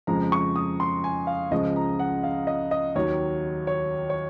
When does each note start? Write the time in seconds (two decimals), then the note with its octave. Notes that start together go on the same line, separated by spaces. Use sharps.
0.07 F2 C#3 F3 G#3 A#5
0.32 C#6
0.56 D#6
0.80 C6
1.04 G#5
1.27 F5
1.51 C#2 C#3 F3 G#3 D#5
1.76 A#5
1.99 F#5
2.23 F5
2.47 D#5
2.71 D#5
2.95 D#2 D#3 F#3 C#5
3.67 C#5
4.10 C#5